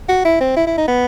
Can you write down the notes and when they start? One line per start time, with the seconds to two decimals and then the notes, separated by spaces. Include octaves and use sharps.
0.09 F#4
0.25 E4
0.41 C4
0.56 E4
0.67 E4
0.78 D#4
0.88 B3